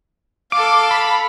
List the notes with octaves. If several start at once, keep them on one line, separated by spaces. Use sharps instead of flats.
A4 F5 D6
B5